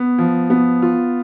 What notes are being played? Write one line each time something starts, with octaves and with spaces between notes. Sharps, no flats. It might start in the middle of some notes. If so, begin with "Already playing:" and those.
Already playing: B3
F3
B3
F4